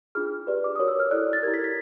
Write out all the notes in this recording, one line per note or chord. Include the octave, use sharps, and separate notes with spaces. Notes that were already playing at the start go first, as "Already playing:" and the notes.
D4 F4 G#4 F6
G4 B4 D5
D6
F#4 A#4 C#5 D#6
E6
F6
E4 A4 D5 F#6
A6
E4 G4 A#4 G#6
B6
B6